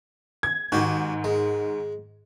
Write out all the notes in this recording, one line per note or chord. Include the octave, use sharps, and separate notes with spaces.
G#6
G#2 D#3 F#4 G4
G#3